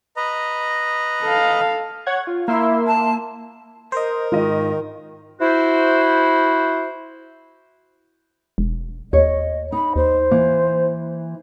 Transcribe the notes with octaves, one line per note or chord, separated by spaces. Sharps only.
B4 D#5 A#5
A4 F5
C#5 F#5 G#6
F4
A#3 E4 E5 C6
A5
A#4 C5 D#5
G#2 D#3 F4 D#5
E4 F#4 C5
E1
D#2 C#5 D#5
D#4 B5
D#2 C5
E3 A#3